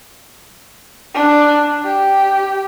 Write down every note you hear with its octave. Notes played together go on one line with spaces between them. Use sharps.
D4
G4